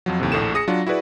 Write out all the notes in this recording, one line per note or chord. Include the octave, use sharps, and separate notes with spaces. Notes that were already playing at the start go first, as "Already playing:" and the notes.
F2 F3 F#3
D#2 A2 C3
A#1 A2 A3 E7
G#4 D#6 A#6 C#7
F#3 D4 F4
E4 F#4 G#4 B4 D5